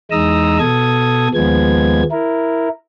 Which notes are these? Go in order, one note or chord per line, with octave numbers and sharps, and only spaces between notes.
E2 G#3 D#4 A#5 D#6 E6
B2 A4 D#6 G#6
D#2 F3 G#3 B3 G#6
E4 A#4